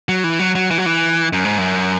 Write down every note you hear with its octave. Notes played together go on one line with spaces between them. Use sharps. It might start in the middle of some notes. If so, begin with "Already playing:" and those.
F#3
E3
F#3
F#3
E3
F#3
E3
F#2
G#2
F#2